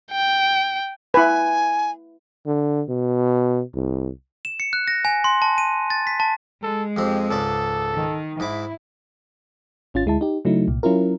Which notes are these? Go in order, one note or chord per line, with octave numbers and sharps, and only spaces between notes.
G5
E4 B4 G#5
D3
B2
C2
E7
C#7
F#6
A#6
G#5
C6
A5
D#7
A6
B6
A5
G#3 A4
F2 C4 G4
C#2 G#2 A4 D5
D#3
G#2 E4 D6
G#1 C#4 F4 A6
D2 G#3 E4 A5
D#4 G4
C#3 F#3 A3 D#4 E4
C2 A#2
F#3 C#4 E4 F4 A#4